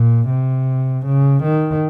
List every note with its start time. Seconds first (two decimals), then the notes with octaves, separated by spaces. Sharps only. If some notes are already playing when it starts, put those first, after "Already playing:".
Already playing: A#2
0.29 C3
1.05 C#3
1.43 D#3